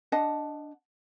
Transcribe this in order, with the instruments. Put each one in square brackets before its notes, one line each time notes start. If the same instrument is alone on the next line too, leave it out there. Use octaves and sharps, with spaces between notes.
[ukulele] D4 D#5 F#5 A5